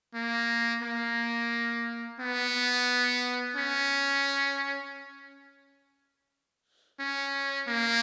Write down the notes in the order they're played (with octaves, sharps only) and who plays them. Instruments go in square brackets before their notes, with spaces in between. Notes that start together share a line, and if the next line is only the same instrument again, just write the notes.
[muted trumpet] A#3
A#3
B3
C#4
C#4
A#3